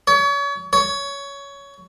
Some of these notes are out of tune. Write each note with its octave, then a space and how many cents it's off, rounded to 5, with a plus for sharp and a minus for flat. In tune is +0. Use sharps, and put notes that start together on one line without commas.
C#5 +35
C#5 +15